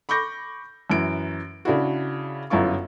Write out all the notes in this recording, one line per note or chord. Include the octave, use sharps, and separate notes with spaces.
B5 C#6 D6 G6 A#6
F#2 E3 D7
C#3 D4 E4 F#4
G1 F#2 F#3 E4 F4 C#6